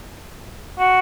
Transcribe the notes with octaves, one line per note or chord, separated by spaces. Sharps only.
F#4